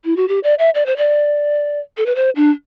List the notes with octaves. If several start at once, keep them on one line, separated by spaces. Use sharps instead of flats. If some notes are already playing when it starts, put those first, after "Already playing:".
E4
F#4
G4
D5
E5
D5
C5
D5
A4
B4
C5
D4